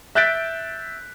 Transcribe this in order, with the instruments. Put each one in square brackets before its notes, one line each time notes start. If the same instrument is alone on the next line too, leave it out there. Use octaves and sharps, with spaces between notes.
[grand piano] E5 F#6 G6 A6 B6 D7